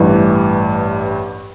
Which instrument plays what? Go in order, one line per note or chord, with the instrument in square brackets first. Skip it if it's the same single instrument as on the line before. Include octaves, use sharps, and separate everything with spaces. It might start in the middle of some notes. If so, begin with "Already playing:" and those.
Already playing: [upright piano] A1 G2 E3